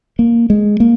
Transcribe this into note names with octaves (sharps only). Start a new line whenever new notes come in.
A#3
G#3
A#3